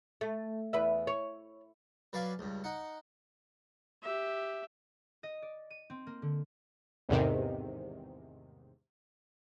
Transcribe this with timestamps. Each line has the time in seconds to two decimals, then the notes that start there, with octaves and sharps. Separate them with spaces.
0.21 A3
0.73 E2 B4 E5
1.07 C#5
2.13 F#3 B4 D5 F5 G#5
2.39 C#2 G2
2.64 D#4 F#5
4.03 G4 E5
5.23 D#5
5.42 D5
5.70 D#7
5.90 C4
6.07 A#3
6.22 D3
7.09 A1 E2 G#2 C3 D#3